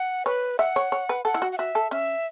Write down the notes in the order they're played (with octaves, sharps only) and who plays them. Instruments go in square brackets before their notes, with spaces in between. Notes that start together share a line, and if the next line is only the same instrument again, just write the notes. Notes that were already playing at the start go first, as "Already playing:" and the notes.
Already playing: [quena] F#5
[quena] B4 [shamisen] C#5
[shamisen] E5 [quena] F#5
[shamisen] C#5
C#5
B4
[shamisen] A4 [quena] F#5
[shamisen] E4
F#4
[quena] F#5
[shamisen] F#4 [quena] E5
[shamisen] A4
[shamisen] C#4 [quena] E5